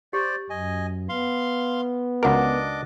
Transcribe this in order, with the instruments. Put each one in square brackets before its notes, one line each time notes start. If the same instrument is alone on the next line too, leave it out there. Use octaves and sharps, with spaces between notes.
[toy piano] G4 [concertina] C5 D5
[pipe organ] F#2 [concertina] D#5 G#5
[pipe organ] B3 [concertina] F5 C6
[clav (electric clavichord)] C#2 A#4 [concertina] D4 D#5 D6 [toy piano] F#4 F#5 G#5